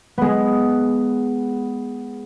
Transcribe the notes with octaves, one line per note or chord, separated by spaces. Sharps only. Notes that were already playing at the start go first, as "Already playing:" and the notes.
G#3 B3